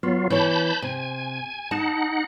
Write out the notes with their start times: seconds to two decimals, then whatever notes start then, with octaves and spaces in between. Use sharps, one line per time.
0.03 F#3 B3 F4
0.30 E3 C#5 A5 B5 G6
0.82 C3 G#5
1.71 D#4 F#5 A5